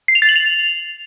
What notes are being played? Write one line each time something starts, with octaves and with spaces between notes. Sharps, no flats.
C7
F7
A6
F#7
F7